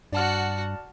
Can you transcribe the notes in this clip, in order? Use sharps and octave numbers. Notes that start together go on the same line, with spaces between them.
G2 F#4 D5 F#5 A5 F6